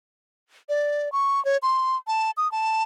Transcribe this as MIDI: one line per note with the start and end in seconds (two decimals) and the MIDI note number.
0.69 1.11 74
1.12 1.43 85
1.45 1.57 73
1.62 1.97 84
2.07 2.31 81
2.37 2.50 87
2.52 2.83 81